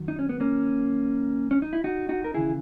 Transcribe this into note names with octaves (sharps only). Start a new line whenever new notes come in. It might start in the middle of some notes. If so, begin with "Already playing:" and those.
Already playing: F#2 D#3 F#3
D#4
C#4
B3
A#3 C#4
C#4
D#4
E4
D#4 F#4
D#4 F#4
A#4
D#2 C#3 E3 E4 G#4